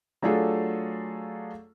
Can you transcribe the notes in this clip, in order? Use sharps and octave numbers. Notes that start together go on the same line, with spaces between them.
F#3 A3 D4 F4 G#4 A4